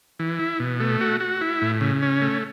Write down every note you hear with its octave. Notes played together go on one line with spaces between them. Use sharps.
E3
E4
B2
A3
F#4
F#4
E4
A2
C#3
C#4
A3